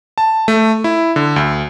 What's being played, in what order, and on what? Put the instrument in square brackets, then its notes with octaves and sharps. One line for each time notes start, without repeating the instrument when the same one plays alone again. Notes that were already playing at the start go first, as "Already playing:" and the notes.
[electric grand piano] A5
A3
E4
D3
D2